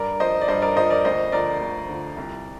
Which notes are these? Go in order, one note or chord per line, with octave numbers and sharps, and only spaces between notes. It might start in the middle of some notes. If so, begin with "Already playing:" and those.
Already playing: G2 A#4 D5
F3 C5 D#5
D5
G2 C5 D#5
A#4 D5
F3 C5 D#5
A#4 D5
D2 C5 D#5
D3 F3 A#4 D5
D2
D3 F3
C2